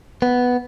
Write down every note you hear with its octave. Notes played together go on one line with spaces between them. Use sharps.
B3